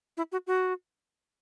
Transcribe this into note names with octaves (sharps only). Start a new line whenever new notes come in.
E4
F#4
F#4